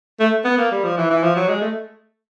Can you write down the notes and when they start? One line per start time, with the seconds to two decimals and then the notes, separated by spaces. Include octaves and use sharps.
0.20 A3
0.45 B3
0.58 A#3
0.71 G3
0.84 F3
0.97 E3
1.11 E3
1.23 F3
1.36 F#3
1.49 G#3
1.62 A3